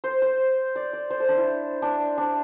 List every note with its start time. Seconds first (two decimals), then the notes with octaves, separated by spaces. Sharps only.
0.04 C5
0.22 C5
0.76 D5
0.93 D5
1.10 C5
1.20 A4
1.29 D4
1.37 E4
1.82 D4
2.18 D4